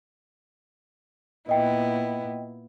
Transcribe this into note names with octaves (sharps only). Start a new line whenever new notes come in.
A#2 B3 E4 D#5 G5